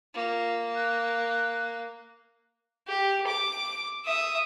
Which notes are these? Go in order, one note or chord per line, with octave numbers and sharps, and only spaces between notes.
A#3 F4
F#6
G4
D6
E5 D#6